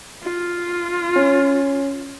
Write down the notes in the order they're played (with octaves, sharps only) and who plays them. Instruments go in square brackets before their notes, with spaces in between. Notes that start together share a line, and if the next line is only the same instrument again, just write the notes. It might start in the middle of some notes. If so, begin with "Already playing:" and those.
[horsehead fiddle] F4
[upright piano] C#4